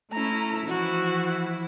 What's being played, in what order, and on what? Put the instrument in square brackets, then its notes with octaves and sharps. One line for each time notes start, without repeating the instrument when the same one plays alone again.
[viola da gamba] A3 C#4 E4 [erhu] A#5
[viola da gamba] E3 F3 E4 [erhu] F#4